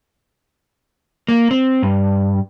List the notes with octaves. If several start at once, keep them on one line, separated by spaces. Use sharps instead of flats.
A#3
C4
G2